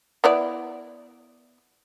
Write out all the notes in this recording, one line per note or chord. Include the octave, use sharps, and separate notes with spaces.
B3 E4 D5